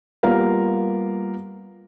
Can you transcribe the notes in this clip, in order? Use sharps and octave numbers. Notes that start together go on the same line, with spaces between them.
G3 A#3 B3 F4 A#4 F5